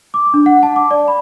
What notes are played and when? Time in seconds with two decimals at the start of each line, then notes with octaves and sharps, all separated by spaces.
0.14 D6
0.34 D4
0.46 F#5
0.63 A5
0.76 D6
0.91 D5
1.08 B5